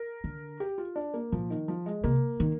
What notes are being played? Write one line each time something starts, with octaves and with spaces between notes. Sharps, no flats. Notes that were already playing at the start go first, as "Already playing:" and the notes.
Already playing: A#4
D3
G4
F4
D4
A#3
A#2 F3
D#3
F3
G#3
C3 A#3
D#3